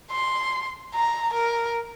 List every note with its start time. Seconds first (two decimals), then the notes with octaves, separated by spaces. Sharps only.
0.11 C6
0.95 A#5
1.34 A#4